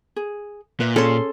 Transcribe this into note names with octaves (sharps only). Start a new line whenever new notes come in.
G#4
A#2 B4 D5 E5
C#4 G#4 A4 C#5 C6